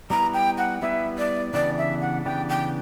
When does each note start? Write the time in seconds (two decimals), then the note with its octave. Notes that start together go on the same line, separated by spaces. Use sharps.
0.10 G3 B3 E4 B4 A#5
0.34 G5
0.58 F#5
0.82 G3 B3 E4 B4 E5
1.18 D5
1.53 C#3 E3 B3 D4 G4 D5
1.78 E5
2.01 F#5
2.25 C#3 E3 B3 D4 G4 G5
2.49 G5